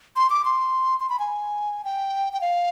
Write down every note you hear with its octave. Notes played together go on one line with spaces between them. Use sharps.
C6
D6
C6
C6
B5
G#5
G5
G5
F5